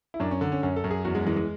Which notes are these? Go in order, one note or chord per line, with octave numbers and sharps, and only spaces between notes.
E4
F#2 D4
C#4
D3
C#4
F#2 C#4
A4
F#2
G#4
E2 F#4
G#3
E3 G#3
G#3